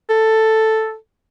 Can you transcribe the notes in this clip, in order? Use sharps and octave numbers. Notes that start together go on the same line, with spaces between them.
A4